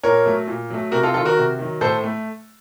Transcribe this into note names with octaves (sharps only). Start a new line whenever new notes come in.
A#2 A#4 C#5
F#3 A3
A#2
F#3 A3
C3 F#4 A#4
F4 A4
D#3 F#3 F4 A4
F#4 A#4
C3
D#3 F#3
A2 A4 C5
A3